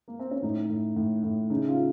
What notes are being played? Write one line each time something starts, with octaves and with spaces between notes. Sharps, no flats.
A#3
C4
C#4
A2 D#4
A2
A2
A2
C#3 D#4
F4